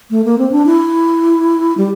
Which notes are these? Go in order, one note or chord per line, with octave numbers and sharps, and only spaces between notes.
A3
A#3
C4
D4
E4
G3